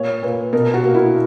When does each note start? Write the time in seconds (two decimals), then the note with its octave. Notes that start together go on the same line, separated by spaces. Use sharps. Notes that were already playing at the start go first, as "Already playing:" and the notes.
Already playing: A#2 C#5
0.23 A#2 B4
0.53 B2 A#4
0.74 F#4
0.84 A#3
0.94 E4